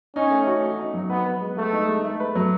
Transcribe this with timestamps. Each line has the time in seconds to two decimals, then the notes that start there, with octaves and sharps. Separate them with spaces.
0.15 C#4 D#4
0.31 A3
0.47 F#4
0.63 F#4
0.79 D#4
0.94 F#3
1.09 B3 B4
1.25 B4
1.41 G#3
1.57 G#3 A3
1.73 D#4
1.88 G#3
2.05 A3
2.20 B4
2.35 F#3